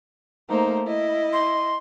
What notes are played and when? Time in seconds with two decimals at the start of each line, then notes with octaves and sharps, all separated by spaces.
0.49 A3 A#3 D#4 C5
0.87 E4 D#5
1.33 C6